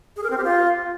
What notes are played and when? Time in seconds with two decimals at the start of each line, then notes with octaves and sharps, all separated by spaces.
0.16 G#4
0.23 A#4
0.30 C4
0.38 G4
0.45 F4